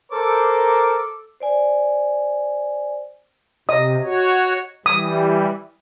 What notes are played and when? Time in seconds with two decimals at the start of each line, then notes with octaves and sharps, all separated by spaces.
0.12 A4 A#4 C5 D6
1.40 C5 D5 G#5
3.69 C3 D#5 D#6
4.03 F#4 C#5
4.86 E3 G3 D#6